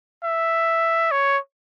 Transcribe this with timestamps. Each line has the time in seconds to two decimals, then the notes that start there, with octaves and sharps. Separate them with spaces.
0.24 E5
1.12 C#5